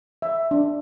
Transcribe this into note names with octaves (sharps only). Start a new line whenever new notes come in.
E5
D4